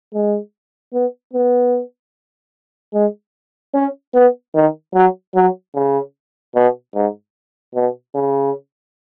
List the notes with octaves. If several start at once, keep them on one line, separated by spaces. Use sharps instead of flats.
G#3
B3
B3
G#3
C#4
B3
D#3
F#3
F#3
C#3
B2
G#2
B2
C#3